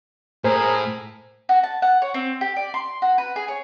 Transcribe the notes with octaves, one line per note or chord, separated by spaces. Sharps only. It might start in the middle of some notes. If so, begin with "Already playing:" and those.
A2 G#4 A#4 C5
F#4
A5
F#5
C#5
C4
G4
D5
C6
F#4
B4
G#4
C#5